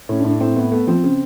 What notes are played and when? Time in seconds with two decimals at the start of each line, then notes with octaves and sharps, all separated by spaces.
0.09 A2 C#4
0.20 D4
0.24 A2
0.30 D4
0.41 A2 C4
0.56 A2 B3
0.72 A3 B3
0.87 F3 C4
1.03 C#3